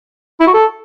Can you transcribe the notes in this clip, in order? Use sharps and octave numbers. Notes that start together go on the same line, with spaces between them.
E4
F#4
A4